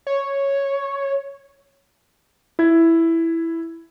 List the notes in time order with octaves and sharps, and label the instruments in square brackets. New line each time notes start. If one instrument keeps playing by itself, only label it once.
[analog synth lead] C#5
[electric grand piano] E4 G#6